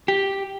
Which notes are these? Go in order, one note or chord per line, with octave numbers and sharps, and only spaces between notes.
G4